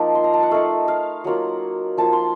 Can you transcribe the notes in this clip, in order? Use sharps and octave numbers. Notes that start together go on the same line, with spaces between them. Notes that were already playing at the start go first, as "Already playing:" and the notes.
Already playing: F3 A#3 D#4 A5
C6
A#5
A5
F#5
A3 D#4 F5
F5
F#3 A#3 F4 F#5
F3 A#3 F4 A5
C6